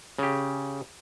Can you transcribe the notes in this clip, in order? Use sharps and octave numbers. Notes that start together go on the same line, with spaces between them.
C#3 G4